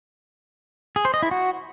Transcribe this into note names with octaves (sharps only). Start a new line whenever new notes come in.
G#4
C5
D#5
E4
F#4